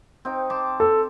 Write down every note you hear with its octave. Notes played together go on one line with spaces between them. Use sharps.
C4 D#4 G5
A5 C6 D6
A4